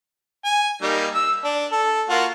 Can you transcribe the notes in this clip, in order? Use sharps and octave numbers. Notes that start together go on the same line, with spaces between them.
G#5
G3 A#3 D#4
E6
D4
A4
A#3 F4 F#4